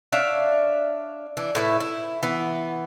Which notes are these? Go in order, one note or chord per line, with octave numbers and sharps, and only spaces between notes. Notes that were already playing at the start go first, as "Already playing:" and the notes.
D4 C#5 E5 F5
E3 D4
A2 E4 B4
E4
E3 B3